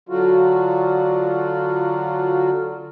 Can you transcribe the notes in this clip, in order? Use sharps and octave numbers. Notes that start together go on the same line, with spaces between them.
D3 F#3 F4 F#4